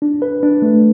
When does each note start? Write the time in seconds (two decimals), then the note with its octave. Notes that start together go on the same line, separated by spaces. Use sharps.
0.02 D4
0.22 B4
0.43 D4
0.62 A3